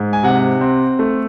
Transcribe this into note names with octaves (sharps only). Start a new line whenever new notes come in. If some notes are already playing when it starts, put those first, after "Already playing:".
Already playing: G#2
G#5
C3 F#5
C4
A3